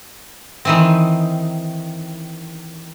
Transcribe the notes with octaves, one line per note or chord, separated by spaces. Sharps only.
D#3 E3 C4